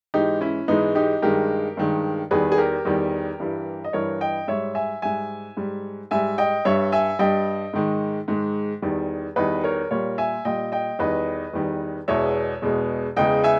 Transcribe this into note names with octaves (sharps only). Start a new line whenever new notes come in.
G#2 E3 G#3 D#4 G4
C#4 E4
G#2 E3 G#3 B3 D#4
D#4 G4
G2 D#3 G#3 G4 A#4
G2 D#3 G#3
E2 D#3 G3 G#4 B4
G#4
G4 A#4
E2 D#3 G3
G2 E3 G3
D#5
G2 E3 G3 A#4 C#5
D#5 G5
G#2 G3 C#5 E5
E5 G#5
G#2 G3 E5 G#5
G#2 G3
G#2 G3 E5 G#5
D#5 G5
G2 G3 C#5 E5
E5 G#5
G2 G3 D#5 G5
G#2 D#3 G#3
G#2 D#3 G#3
E2 D#3 G3
E2 D#3 G3 B4 D#5
A#4 C#5
A#2 G3 A#4 C#5
E5 G#5
A#2 G3 D#5 G5
D#5 G5
E2 D#3 G3 B4 D#5
E2 D#3 G3
E2 B2 G#3 C#5 E5
E2 B2 G#3
E2 C#3 G#3 D#5 G5
E5 G#5